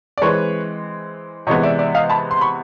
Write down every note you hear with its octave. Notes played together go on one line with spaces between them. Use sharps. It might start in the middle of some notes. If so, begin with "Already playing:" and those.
D5
E3 G#3 C4 B4 C#5
C3 E3 G#3 B3 C#5 D#5
D5 E5
D5 E5
D#5 F5
A5 B5
C6
B5 C#6